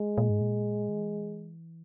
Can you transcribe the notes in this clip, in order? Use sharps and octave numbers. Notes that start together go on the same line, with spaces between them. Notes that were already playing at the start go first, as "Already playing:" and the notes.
Already playing: G#3
A#2
G#2
A#2
D#3
E3